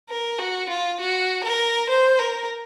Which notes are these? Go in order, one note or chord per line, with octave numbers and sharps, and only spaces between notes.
A#4
F#4
F4
F#4
A#4
C5
A#4